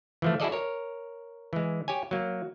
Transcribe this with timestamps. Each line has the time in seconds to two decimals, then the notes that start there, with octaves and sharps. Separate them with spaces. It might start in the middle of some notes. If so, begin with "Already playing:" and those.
0.22 E3 F3 A3
0.40 E4 F#4 G#4 A4 D5 D#5
0.52 A#4 C#5
1.53 E3 G#3
1.88 G4 C#5 G#5
2.11 F#3 A#3